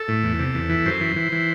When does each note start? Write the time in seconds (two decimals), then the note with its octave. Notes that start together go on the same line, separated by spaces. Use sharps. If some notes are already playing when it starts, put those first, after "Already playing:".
Already playing: A4
0.08 A2
0.23 E2
0.39 C3
0.55 E2
0.70 E3
0.86 F#2 C5
1.01 E3
1.16 E3
1.32 E3